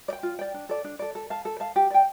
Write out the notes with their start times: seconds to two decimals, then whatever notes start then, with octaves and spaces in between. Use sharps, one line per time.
0.08 D5
0.13 G5
0.23 F4
0.39 D5 G5
0.54 D4
0.69 A4 D5
0.84 D4
0.99 A4 D5
1.15 A4
1.30 F5 A5
1.45 A4
1.60 F5 A5
1.76 G4
1.90 D5 G5